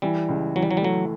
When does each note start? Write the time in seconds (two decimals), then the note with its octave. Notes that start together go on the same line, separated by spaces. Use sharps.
0.02 E3 G3
0.29 C#2
0.56 E3 F#3
0.62 G3
0.71 F#3
0.77 G3
0.82 F#3 A3